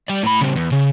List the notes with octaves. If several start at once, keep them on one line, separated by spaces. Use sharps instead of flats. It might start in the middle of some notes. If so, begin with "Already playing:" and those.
G3 D5
A2 B5
C#3 G3
E2
C#3